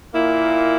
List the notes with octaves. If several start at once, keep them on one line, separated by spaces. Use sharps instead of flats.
A#2 A#3 E4